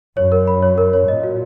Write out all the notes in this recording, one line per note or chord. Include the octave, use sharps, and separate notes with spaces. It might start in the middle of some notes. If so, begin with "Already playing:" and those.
F#2 C#5
A#4
B5
C#5
A#4
C#5
A#2 D#5
F#4